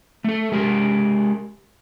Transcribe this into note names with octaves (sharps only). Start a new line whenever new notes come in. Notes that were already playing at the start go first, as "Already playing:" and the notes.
A3 A4
G#3 G4 A#4